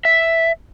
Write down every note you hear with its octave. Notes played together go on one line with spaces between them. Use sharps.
E5